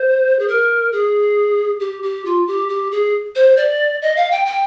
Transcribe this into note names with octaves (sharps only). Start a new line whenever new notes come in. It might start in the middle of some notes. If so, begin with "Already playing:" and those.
Already playing: C5
G#4
A#4
G#4
G4
G4
F4
G4
G4
G#4
C5
D5
D#5
F5
G5
G5